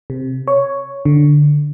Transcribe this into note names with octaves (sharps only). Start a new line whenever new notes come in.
C3
C#5
D3